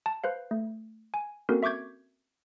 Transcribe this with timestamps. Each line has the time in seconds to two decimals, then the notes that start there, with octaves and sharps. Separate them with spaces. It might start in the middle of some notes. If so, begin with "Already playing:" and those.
0.06 A5
0.24 B4 C5 F5
0.51 A3
1.14 G#5
1.49 A#3 C4 C#4 F#4 A4 A#4
1.63 E5 C#6 D6 G6 G#6